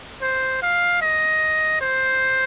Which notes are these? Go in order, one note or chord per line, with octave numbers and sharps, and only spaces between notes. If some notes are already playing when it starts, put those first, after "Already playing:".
C5
F5
D#5
C5